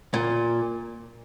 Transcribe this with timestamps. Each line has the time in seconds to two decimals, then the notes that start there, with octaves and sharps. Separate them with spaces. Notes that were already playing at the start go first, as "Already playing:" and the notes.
0.14 A#2